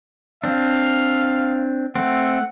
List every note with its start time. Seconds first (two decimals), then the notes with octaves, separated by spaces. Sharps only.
0.44 C4 D4 F5
1.96 A3 C4 F#5